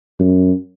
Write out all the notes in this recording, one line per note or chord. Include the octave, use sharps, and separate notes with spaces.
F#2